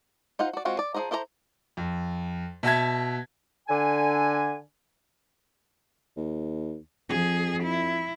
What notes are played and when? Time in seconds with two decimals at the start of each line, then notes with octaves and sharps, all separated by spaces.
0.39 D#4 F4 C5 F#5
0.53 F#4 D5
0.65 G#3 C4 F4 F#4
0.79 D5
0.94 F3 D#4 G#4 C5 A#5
1.11 E4 A4 C5 D5 A#5
1.77 F2
2.63 B2 E5 A5 G#6
3.68 D3 G#5
6.17 D#2
7.09 F2 F3 G#4
7.63 E4